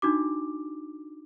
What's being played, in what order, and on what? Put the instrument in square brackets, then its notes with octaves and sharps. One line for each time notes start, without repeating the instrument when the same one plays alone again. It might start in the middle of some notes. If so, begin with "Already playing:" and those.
[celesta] D4 D#4 F#4 D6